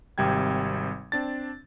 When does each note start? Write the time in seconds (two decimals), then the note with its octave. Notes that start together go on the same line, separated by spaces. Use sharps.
0.18 G#1 C3 G3 G5 G#6
1.12 C4 D4 A6